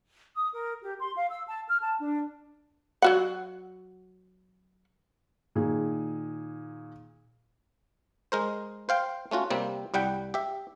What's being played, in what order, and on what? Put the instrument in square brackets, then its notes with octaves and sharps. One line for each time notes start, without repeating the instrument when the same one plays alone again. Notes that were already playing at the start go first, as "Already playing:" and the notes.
[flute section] D#6
A#4
G4
C6
F5
E6
A5
F6
A5
D4
[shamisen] F#3 F#4 F#5
[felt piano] A#2 D#3 G#4
[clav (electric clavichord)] G#3 A#4 C5
C5 F5 G5
A3 C#4 F4 F#4
C3 G3 A#3 C4
C2 G3 F#5 G5
G4 E5